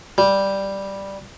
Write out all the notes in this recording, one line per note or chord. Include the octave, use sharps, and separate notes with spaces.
G3